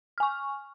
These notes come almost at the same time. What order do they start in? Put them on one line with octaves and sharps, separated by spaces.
F6 G#5 C#6